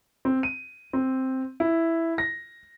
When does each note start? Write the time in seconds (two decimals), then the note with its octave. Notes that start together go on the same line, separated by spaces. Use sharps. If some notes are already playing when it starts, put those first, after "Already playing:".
0.25 C4
0.43 D#7
0.93 C4
1.60 E4
2.18 A#6